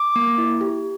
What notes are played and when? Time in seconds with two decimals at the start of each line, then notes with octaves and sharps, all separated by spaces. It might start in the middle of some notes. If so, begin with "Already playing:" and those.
Already playing: D6
0.16 A#3
0.38 E4
0.61 G4